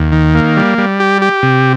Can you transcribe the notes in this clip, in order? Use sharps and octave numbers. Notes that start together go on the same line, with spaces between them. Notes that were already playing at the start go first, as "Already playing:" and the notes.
Already playing: D#2
D#3
A#3
G3
G3
G4
G4
C3